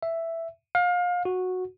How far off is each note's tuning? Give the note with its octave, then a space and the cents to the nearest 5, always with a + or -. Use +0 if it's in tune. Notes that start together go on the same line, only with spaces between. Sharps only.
E5 +5
F5 +30
F#4 -10